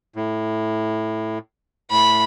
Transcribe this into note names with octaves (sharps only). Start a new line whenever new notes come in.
A2
A2 B5